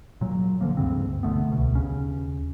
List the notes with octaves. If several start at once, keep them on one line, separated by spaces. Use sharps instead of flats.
A#2 F#3
D3 D#3 F3 A#3
D2 G2 C#3 C4
B1 D3 A3 B3
C#2 B2
D#2 C#3 C#4